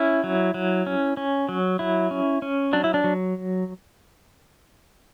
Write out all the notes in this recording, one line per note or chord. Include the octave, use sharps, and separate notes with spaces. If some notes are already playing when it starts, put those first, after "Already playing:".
Already playing: C#4 E4
F#3
F#3
C#4
C#4
F#3
F#3 E4
C#4
C#4
F#3 D4
E4
D4
F#3